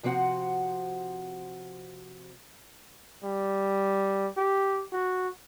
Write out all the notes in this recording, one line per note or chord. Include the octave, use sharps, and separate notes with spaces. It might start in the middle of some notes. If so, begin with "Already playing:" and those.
C3 F3 C4 F#4 F#5
G3
G4
F#4